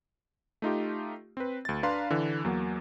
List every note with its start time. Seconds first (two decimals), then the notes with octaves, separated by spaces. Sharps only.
0.62 A3 D#4 F4 G4
1.37 C4 B4
1.65 D2 A6
1.83 D4 B4 F5 A#5 C6
2.10 D3 E3
2.44 E2 F#3 A#3